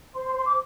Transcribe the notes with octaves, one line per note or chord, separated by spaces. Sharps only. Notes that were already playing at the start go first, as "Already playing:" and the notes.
C5 C6
C6
C5 C6
D6